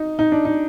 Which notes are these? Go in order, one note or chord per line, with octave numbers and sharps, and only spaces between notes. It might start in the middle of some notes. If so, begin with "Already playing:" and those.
Already playing: D#4
D#4
D4
D#4